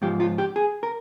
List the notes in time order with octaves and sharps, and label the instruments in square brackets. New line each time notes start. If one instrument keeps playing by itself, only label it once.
[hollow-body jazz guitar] G#2 F3 G4
F4
G4
G#4
A#4